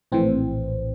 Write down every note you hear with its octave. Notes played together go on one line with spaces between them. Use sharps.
A#1 A2 E3 C4